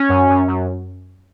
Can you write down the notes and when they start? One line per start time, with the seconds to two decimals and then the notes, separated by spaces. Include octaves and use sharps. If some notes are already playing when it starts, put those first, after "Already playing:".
Already playing: C#4
0.09 F#2
0.29 F#2
0.48 F#2